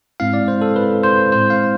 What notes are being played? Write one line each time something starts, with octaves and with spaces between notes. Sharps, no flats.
G#2 G#3 C4 E4 F5
D5
C5
A4
B4
C5
A2 G#3 C4 E4 C5
F5